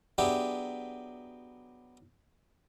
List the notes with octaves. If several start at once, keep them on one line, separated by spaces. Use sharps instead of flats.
F#3 B3 D4 G4 G#4 E5